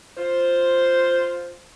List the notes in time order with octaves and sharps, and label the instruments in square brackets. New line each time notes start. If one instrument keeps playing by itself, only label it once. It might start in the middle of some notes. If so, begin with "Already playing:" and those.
[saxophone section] F4 C5